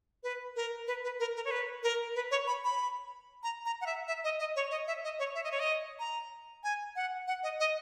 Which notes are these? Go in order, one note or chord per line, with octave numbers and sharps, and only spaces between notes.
B4
A#4
B4
B4
A#4
A#4
C#5
B4
A#4
B4
C#5
B5
B5
A#5
A#5
F#5
E5
E5
D#5
D#5
C#5
D#5
E5
D#5
C#5
E5
D#5
C#5
D#5
A#5
G#5
F#5
F#5
D#5
D#5